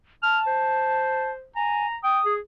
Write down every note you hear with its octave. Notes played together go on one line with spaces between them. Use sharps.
A5 F6
C5
G#5 A#5
G5 D#6
G#4